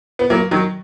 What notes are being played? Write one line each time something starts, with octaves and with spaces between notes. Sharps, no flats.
B3
F#3 A#3
D#3 F#3